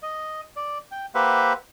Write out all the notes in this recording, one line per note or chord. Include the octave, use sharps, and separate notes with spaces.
D#5
D5
G5
A#3 G4 B4 C5 E5 F#5